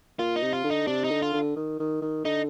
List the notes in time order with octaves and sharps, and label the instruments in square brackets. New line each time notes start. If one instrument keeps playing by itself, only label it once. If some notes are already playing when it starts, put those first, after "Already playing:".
[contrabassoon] A#2 [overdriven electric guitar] F4
[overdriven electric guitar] D#4
[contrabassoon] C3
[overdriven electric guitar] F4
[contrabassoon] D3
[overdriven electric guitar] D#4
[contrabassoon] C3 [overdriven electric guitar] D4
[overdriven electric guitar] D#4
[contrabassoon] D3
[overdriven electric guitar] F4
[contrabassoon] D3
D#3
D#3
D#3
[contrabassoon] D3 [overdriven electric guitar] D#4